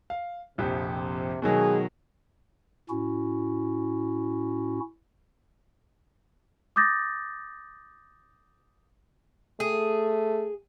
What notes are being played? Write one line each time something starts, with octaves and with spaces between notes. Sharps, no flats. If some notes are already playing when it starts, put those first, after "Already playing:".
F5
A#1 F2 C3 G4
B2 D#3 F#3 G#3 G#4
A2 C#4 E4 F#4
D6 D#6 G6 A6 A#6
A3 G#4